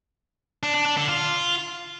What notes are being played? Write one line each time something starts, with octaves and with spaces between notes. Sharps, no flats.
D4
D4
D4
D3
F4